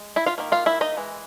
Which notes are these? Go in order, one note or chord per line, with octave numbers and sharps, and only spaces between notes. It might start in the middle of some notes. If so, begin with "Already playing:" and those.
Already playing: G#3
E4 E5
F4 F5
D#3 F#3 A#3
F4 F5
E4 E5
D#4 D#5
E3 G#3